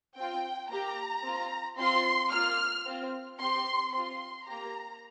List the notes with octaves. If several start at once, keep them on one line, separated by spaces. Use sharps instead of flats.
C4 F4 G5
A#3 G4 A#5
C4 F4
C4 F4 C6
A#3 F4 F6
C4 F4
C4 G4 C6
C4 F4 C6
A#3 G4 A#5